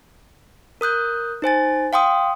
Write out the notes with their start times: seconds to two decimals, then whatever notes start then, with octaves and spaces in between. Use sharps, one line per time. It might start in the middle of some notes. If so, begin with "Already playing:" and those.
0.81 A#4 D#6 F#6 G6
1.42 D#4 C5 G#5 A6
1.93 F5 G5 C6 D#6